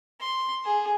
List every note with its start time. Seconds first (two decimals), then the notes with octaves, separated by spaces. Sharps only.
0.20 C6
0.65 G#4